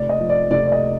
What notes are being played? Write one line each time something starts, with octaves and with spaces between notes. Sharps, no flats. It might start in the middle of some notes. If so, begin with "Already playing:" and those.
Already playing: F1 D5
D#5
F3
D5
F1 D5
D5
D#5